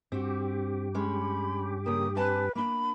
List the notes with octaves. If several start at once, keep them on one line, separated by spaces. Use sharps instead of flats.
G2 C4 F#4 G4
G#3 C#4 C#5 B5
C#3 A#3 D#6
C4 B4 G#5 A5
A#3 D4 B5